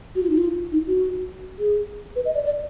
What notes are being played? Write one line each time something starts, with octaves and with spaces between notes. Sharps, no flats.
F#4
F4
D#4
F4
D#4
F#4
G#4
B4
D#5
D5
D5